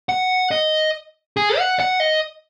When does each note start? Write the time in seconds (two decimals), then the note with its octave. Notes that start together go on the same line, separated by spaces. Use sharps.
0.09 F#5
0.51 D#5
1.37 G#4
1.58 F#5
1.80 F#5
2.00 D#5